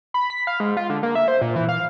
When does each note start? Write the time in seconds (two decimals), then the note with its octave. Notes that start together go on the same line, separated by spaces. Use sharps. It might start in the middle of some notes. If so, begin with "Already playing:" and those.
0.14 B5
0.30 B6
0.47 F5
0.60 G#2
0.77 F4
0.90 D3
1.03 A#3
1.15 E5
1.28 C5
1.42 A#2
1.56 E3
1.69 F5